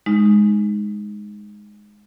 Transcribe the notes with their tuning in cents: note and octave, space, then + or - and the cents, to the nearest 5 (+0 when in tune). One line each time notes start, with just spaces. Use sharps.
G#3 +0 D#4 +0